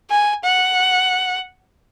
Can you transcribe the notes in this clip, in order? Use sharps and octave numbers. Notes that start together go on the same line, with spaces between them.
G#5
F#5